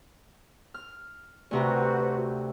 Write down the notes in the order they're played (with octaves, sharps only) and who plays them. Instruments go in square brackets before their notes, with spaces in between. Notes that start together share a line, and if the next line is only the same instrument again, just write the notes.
[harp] F6
[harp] D2 C3 A#5 [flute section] F#4 B4 C5